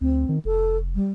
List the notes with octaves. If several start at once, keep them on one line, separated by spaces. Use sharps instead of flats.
D2 C4
D#3
F1 A4
G3